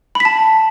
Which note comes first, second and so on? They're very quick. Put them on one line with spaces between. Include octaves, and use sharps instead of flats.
B5 B6 A5